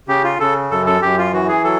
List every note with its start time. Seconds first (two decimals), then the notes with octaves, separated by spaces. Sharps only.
0.08 C#3 G4
0.24 F4
0.40 C#3 A4
0.71 F#2 A4
0.86 A4
1.01 F#2 G4
1.18 F4
1.33 E3 F#4
1.48 G#4
1.64 F#3 A4